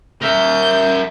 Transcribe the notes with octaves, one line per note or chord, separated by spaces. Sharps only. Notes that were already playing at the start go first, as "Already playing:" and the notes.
A#4 E5 G6